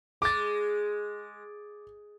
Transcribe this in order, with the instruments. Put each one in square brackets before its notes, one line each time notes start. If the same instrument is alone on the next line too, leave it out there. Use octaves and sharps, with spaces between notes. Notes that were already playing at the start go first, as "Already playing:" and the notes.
[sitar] G#3 [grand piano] D6 A6